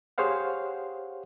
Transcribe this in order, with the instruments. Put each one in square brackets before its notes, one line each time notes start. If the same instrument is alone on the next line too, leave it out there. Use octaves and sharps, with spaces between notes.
[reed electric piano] G4 G#4 C5 C#5 F5 F#5